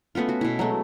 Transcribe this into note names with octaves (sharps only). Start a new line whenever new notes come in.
A3 B3 C#4 F4
F#4
B2 E4
F#3 G#3 A3